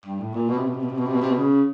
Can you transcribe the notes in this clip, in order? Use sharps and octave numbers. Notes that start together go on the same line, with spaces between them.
G2
A2
A#2
B2
C3
B2
C3
B2
C3
B2
C3
B2
C3
B2
C#3